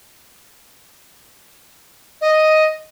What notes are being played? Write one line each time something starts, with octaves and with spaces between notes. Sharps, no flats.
D#5